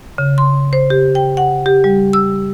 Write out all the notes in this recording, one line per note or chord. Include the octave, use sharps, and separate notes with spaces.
C#3
C6
C5
G4
G5
F#5
G4
G3
E6